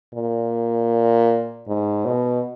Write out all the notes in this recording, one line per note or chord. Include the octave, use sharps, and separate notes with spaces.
A#2
G#2
B2